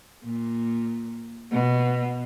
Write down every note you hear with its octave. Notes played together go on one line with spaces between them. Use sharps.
A#2
B2